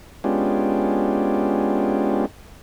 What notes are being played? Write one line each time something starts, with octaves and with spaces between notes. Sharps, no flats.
G#3 B3 C#4 D4 F4 G4